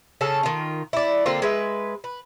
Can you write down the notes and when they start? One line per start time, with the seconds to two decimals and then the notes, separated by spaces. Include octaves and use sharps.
0.21 C#3 C#4 A4
0.43 D#3 F4
0.93 E4 D5
1.26 D3 A#3 C4 F4
1.42 G#3 B4 E5
2.04 B4